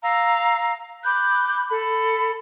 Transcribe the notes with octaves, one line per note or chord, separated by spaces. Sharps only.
F5 A#5 E6
B5 D6 F#6 G6
A4 B5